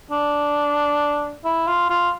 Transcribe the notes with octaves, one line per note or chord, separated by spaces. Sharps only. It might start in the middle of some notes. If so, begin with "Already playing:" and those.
D4
E4
F4
F4